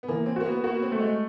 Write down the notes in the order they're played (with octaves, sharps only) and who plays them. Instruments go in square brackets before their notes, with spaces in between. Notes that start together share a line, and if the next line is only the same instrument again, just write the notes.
[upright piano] B3
[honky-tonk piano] E3 [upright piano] A#3
[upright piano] C4
[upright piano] A#3 [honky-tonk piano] F#4
[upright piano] B3
[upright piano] A#3 [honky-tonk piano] F#4
[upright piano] B3
C4
[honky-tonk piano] A3
[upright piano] G#3